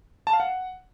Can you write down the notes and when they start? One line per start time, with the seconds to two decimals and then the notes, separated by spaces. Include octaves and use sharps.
0.27 A5
0.33 F5
0.40 F#5